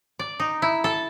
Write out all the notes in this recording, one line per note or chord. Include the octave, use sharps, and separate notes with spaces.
D5
D#4
E4
A4